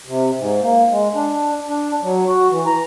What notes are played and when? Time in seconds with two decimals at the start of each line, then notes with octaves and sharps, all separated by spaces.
0.06 C3
0.38 G#2
0.62 A#3
0.90 G#3
1.15 D4
1.68 D4
2.02 F#3
2.27 F#4
2.50 E3
2.66 A#5